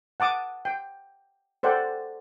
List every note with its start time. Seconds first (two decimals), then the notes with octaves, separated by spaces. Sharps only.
0.20 F#5 A5 D6 D#6
0.65 G5
1.63 A4 C5 D5 F#5 G5